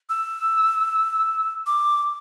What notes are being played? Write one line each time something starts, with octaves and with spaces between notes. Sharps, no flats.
E6
D6